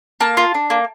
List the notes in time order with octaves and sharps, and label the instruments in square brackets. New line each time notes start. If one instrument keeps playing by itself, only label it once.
[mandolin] A#3 A5
F4
D4
A#3